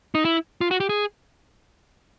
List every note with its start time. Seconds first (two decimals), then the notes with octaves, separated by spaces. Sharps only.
0.15 D#4
0.25 E4
0.61 F4
0.71 F#4
0.80 G4
0.89 G#4